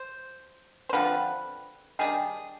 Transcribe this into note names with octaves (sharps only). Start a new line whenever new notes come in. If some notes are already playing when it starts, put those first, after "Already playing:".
Already playing: C5
C5
D3 F3 C4 B4
D#3 G3 D4 G#4